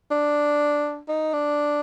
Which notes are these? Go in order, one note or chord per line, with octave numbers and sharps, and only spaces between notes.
D4
D#4
D4